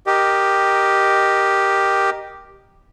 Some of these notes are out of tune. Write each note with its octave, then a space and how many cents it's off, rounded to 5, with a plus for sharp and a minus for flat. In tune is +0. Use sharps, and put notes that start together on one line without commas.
G4 +0 A#4 +5 D#5 -10